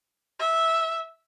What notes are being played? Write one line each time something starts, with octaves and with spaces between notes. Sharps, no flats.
E5